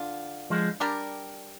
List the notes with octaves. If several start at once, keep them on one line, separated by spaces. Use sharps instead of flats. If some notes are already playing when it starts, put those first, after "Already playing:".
Already playing: D3 F4
F3 G#3
G3 D4 G4 A#4